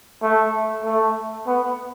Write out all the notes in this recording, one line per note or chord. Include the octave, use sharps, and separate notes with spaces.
A3
A3
B3